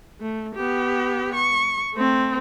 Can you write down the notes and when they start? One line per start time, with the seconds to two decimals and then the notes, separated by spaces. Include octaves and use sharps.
0.21 A3
0.55 B3 G4
1.35 C#6
1.94 A3 C4